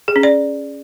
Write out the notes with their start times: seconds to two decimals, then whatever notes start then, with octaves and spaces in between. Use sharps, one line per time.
0.08 G#4
0.16 C#4
0.23 D5